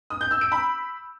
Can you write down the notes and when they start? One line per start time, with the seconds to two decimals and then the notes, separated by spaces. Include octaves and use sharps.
0.10 D#6
0.21 G6
0.31 E6
0.41 D7
0.52 B5